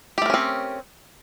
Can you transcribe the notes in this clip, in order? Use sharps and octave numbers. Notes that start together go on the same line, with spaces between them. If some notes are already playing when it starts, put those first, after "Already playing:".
A3 C4 C#4 G4 A#4